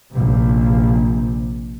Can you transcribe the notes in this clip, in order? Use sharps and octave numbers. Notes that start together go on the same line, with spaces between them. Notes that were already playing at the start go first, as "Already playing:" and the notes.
A#1 C3